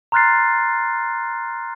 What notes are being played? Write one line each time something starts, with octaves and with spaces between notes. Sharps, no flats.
A#5 C6 F6 F#6 A6 C7